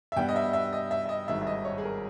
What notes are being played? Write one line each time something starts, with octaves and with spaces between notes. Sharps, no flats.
E5
G2 G3 B3 G5
D#5
E5
E5
D#5
E5
E5
D#5
G#1 G2 D#3 G#3 E5
E5
D#5
C#5
G#4
A#4